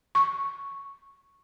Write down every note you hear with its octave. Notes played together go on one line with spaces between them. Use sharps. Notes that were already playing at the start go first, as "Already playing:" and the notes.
C#6